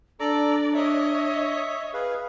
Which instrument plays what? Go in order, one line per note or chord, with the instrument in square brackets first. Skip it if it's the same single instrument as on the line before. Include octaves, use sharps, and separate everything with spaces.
[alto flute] D4 [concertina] A4 A#5 [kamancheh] D5
[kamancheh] C#5 D#5 [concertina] E5
[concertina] G#4 B4 F5